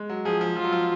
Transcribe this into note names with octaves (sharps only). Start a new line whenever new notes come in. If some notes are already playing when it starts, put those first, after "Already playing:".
Already playing: G#3
F#3
F3 G#4
F3
F3 F4
F#3
F3